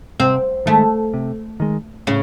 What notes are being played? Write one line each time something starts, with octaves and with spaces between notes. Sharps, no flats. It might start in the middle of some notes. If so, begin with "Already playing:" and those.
C3 C4
D#3 G#3 A3
C3
D#3 G#3
A2 C#3